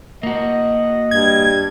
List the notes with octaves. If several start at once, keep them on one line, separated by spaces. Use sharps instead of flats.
A#3 F#4 D#5
G2 G#6